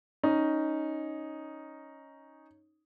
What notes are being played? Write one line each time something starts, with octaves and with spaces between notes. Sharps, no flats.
C#4 D#4